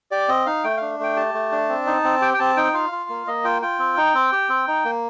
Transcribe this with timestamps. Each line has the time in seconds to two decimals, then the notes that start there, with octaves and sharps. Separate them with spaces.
0.11 G4 D5
0.29 C4 D#5
0.46 D#4 F5
0.64 A3 G5
0.77 D4 F5
1.00 A3 G5
1.16 G4 A5
1.34 A3
1.52 D4
1.69 C4
1.86 D#4
2.04 C4
2.22 G4 G5
2.34 G5
2.39 C4 A5
2.57 D#4 G5
2.74 F4 F5
2.92 F4
3.10 A#3
3.27 A#3 D#5
3.44 F4 G5
3.62 F4 G5
3.79 C4
3.97 D#4
4.14 C4
4.33 G4
4.49 C4
4.68 D#4
4.85 A#3